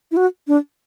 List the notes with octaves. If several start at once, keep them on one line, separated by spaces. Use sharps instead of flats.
E4
F#4
D4